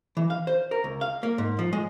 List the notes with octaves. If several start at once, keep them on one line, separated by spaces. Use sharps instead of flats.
E3
F5
C5
A#4
C#2
F5
A#3
G#2
F3
G#3